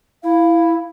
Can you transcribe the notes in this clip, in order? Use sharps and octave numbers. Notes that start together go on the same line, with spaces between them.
E4 F5